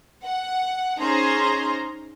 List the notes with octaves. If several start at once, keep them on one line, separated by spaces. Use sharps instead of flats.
F#5
C#4 D#4 G#4 C5 A#5 C6